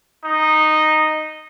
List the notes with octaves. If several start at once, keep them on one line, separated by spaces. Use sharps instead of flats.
D#4